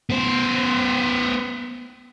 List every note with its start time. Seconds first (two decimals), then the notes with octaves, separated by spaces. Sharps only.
0.10 B3 C5